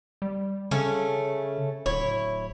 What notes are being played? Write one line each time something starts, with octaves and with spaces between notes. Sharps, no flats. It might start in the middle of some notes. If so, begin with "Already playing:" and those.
G3
C#3 A3 C#4
D1 E4 C#5